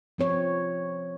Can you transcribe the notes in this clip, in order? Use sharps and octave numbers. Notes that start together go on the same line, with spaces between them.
F3 C4 C#5